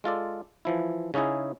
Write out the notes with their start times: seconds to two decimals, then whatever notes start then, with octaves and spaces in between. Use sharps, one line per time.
0.04 G#3 F4 A4 D5
0.65 E3 F3 E4
1.14 C#3 C#4 D#4 E4 G#4